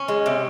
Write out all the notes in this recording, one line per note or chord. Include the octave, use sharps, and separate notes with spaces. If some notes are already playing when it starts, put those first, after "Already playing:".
Already playing: C#4
G#3
C3